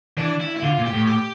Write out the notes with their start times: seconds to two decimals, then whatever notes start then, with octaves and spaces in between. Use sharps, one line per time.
0.17 E3 D4
0.40 E4
0.55 E4
0.63 D3 F4
0.78 A#2
0.85 G4
0.93 A2
1.07 G4